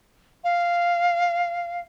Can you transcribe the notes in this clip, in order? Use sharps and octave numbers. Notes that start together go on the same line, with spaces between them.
F5